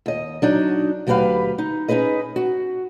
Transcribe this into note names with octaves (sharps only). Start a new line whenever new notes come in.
D#2 D#5
F#3 D4 D#4
D2 F#3 G4 A#4 B4 F5
D#4
C#4 D#4 G#4 B4 D#5
F#4